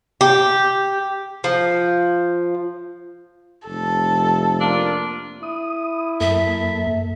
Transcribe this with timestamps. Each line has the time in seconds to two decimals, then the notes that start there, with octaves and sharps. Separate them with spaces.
0.21 G4
1.44 F3
3.67 F1 A4
4.61 A#3 D4 F4
5.43 E4 D#6
6.21 F#2 A#3 A4 E5